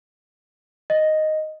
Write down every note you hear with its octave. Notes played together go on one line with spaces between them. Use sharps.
D#5